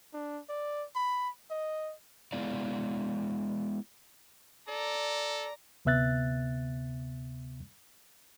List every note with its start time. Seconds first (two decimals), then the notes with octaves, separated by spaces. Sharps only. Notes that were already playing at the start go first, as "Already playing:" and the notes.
0.14 D4
0.49 D5
0.95 B5
1.51 D#5
2.32 G#3 B3 E4 D5 F5
4.69 A4 D5 A#5
5.85 D2 C3 B3 E5 F#6 A6